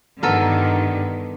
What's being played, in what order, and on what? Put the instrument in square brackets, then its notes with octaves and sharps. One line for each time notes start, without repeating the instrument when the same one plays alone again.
[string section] G2 D3 D#3 [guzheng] B3 A4 A#4